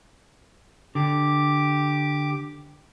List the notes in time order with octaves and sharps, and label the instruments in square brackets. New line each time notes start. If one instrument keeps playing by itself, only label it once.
[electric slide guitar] D3 [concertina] G4 D6